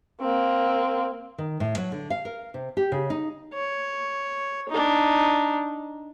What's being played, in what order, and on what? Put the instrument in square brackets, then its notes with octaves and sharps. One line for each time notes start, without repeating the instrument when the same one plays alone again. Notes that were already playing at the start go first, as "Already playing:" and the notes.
[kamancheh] A#3 C4
[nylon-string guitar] D#3
A2
F#3
D3
F5
A#4
C3
G4
C#3
D#4
[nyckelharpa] C#5
D4 D#4